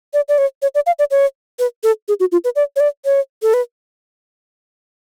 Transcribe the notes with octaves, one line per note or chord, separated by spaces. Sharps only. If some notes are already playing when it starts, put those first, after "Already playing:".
D5
D5
C#5
C#5
D5
F5
D5
C#5
B4
A4
G#4
F#4
F4
B4
D5
C#5
D5
C#5
A4
B4